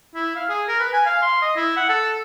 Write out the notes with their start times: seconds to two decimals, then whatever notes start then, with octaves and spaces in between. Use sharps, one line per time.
0.15 E4
0.36 F5
0.49 G#4
0.68 A#4
0.80 B4
0.93 G#5
1.06 F5
1.22 C6
1.42 D#5
1.56 E4
1.77 F#5
1.89 A4